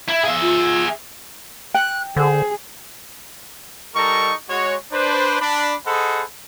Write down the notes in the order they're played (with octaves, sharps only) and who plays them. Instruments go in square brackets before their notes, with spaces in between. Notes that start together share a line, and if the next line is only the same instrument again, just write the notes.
[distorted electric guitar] E4
[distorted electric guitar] G#4 E5 [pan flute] F5
[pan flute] F4
[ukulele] G5 [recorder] F#6
[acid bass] D3 [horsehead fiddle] G#4 [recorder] C5
[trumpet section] G3 D#4 A4 A#4 D#5 C#6
G#3 F#4 C#5
D4 B4 C5
D4 B5
G#4 A4 C5 D#5 F#5 B5